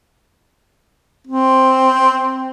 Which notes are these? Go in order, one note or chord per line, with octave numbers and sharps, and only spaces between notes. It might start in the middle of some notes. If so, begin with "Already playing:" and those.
C4